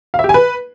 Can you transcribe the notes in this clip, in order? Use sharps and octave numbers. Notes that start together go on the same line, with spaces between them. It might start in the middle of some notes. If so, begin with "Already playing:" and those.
F5
E5
G4
G#5
B4